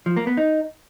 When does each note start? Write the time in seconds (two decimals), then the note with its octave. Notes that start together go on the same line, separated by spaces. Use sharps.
0.06 F3
0.17 A#3
0.27 B3
0.37 D#4